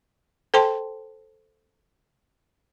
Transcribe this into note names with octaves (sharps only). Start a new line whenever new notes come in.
A4 C5 G5 A5 C6